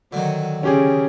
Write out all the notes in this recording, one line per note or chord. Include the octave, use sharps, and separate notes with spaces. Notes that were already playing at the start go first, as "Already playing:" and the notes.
D3 D#3 F#3
C#3 C#4 G4 G#4